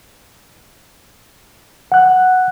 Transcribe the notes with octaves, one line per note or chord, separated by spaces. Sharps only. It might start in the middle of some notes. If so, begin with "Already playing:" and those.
F#5 F#6